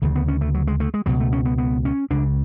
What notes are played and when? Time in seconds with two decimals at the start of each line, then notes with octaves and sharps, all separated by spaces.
0.02 D2 C#3 E3
0.16 B3
0.28 C#4
0.41 A3
0.54 F#3
0.67 G#3
0.80 A3
0.94 G#3
1.06 C#2 B2 F#3
1.20 A3
1.33 C#4
1.45 B3
1.58 B3
1.85 C#4
2.10 C#2 C#3 D4